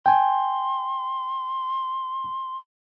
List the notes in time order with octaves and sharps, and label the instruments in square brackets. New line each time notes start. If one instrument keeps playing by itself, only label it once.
[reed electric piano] G5 G#5 [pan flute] C6